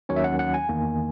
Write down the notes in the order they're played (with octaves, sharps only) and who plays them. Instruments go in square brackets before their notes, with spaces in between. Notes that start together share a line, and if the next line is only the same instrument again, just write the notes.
[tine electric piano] D#2 D#3 F#3 C#4 C#5
E5
F#5
F#5
G#5
E2 D#3 A#3